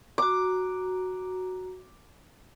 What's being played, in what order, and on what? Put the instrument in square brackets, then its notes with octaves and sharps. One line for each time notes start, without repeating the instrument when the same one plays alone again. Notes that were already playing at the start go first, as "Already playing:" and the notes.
[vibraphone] F#4 A#5 [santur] D6